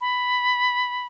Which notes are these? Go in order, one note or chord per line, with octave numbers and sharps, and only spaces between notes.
B5